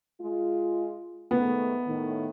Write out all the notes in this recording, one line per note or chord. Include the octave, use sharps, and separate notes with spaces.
G#3 F4
G#2 D#3 A3 B3
A2 D#3